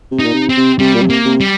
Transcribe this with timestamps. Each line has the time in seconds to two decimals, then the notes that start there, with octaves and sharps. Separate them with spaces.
0.12 C3
0.19 D#4
0.25 A#2
0.34 C3
0.49 C4
0.57 C3
0.79 C3 G3
0.95 A#2
1.02 C3
1.10 A#3
1.25 C3
1.41 G3